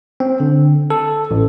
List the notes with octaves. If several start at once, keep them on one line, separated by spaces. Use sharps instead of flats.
C4
D3
A4
A1